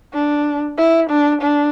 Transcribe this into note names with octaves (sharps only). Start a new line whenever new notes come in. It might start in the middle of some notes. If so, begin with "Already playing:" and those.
D4
E4
D4
D4